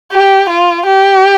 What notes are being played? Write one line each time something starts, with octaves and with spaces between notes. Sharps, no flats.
G4
F4
G4